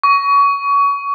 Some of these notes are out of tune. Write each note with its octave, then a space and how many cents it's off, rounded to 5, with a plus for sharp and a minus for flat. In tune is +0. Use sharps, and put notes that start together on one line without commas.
C#6 +25